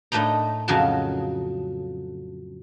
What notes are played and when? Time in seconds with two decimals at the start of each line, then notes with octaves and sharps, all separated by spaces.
0.12 A2 A3 D4 D#4 A#5
0.68 F2 C#3 F#3 D#4 F#4 A5